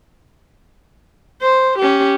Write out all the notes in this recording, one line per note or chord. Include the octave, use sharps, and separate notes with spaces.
C5
C#4 G4